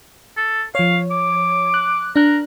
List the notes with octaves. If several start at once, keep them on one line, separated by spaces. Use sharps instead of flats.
A4
F3 C#5 F5
D6
F#6
D4 A#4 F#6